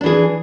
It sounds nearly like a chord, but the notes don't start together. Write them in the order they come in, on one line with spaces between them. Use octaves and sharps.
D4 E3 G#4